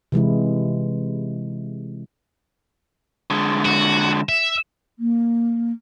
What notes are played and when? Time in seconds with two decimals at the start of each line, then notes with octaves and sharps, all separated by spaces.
0.12 C3 E3 G#3 E4
3.30 D3 G#3
3.65 F#4
4.29 E5
4.99 A#3